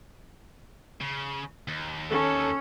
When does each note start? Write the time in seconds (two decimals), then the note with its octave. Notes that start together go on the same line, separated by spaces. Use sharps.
1.01 C#3
1.68 D#2
2.10 C#4 A4